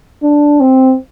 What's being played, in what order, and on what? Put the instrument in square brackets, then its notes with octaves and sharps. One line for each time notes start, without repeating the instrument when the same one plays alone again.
[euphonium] D4
C4